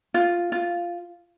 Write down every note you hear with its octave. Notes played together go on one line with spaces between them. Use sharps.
F4
F4